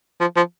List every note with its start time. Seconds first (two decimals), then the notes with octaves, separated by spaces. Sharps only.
0.20 F3
0.36 F3